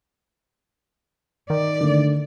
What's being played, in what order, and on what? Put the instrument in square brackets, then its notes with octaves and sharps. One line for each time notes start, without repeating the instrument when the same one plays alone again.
[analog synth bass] D#3 [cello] D5
[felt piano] D3 A3